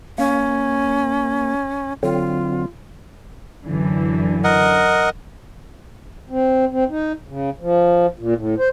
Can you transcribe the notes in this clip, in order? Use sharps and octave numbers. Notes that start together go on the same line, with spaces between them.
A#3 C#4
D3 F#3 C4 F4
F#2 D3 E3
A#4 D#5 F#5
C4
C4
D#4
C#3
F3
A#2
A2
C5